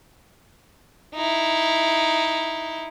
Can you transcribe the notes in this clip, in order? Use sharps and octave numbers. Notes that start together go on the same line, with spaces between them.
D#4 E4